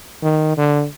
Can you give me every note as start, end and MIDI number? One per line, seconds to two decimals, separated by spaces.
0.22 0.53 51
0.57 0.85 50